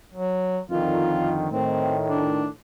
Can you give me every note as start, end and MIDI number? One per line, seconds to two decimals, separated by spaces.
0.13 0.59 54
0.70 1.48 41
0.70 1.48 50
0.70 1.48 51
0.70 1.42 65
1.51 2.49 45
1.51 2.49 51
1.51 1.95 60
2.09 2.47 62